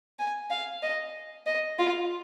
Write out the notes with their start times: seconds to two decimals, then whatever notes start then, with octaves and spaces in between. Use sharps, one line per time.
0.19 G#5
0.50 F5
0.82 D#5
1.46 D#5
1.79 F4